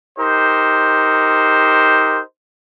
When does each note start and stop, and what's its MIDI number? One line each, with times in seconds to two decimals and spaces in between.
0.18 2.21 63
0.18 2.21 67
0.18 2.21 70
0.18 2.21 72